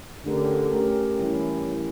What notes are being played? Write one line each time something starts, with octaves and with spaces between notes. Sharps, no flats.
D3 A3 C#4 G4 A#4
A3 C#4 G4 A#4
E3 G3 C#4 E4
E3 G3 C#4 E4